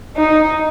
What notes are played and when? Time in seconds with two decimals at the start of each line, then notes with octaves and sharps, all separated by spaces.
0.17 D#4